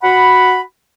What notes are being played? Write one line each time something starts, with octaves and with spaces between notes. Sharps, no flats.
F#4 F#5 B5